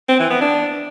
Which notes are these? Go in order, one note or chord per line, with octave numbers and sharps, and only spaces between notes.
C4
E3
B3
D4